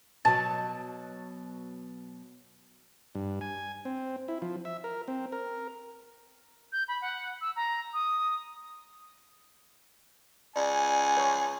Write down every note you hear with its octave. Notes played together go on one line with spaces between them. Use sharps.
B2 F#3 A5
G2
G#5
C4
E4
F3
E5
A#4
C4
A#4
G6
B5
F#5
E6
A#5
D#6
C#2 D5 G#5
C#5 C#6